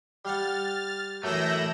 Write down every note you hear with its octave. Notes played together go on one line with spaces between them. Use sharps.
G3 F5 F#5 F6 A6
F#2 E3 A3 E4 E6 G6 A#6